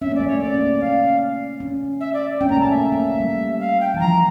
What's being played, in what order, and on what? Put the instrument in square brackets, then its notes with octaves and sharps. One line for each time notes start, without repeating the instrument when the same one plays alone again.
[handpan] C#4 [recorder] E5
[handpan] A#3
[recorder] D5
[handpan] A3
[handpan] A#3 [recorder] C#5
[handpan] C#4 [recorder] D5
[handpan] C#4
A#3
[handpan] C#4 [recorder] F5
[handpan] C#4
[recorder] E5
D5
[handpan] C#4 [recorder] G5
[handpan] A#3 [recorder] A#5
[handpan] A3
[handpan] A#3 [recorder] A5
[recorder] E5
[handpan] A#3
A3
G3
[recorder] F5
G5
[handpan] E3 [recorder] A5
[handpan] F3 [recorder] A#5